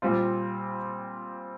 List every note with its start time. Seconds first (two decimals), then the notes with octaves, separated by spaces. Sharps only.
0.02 A#2 G3 C4 F4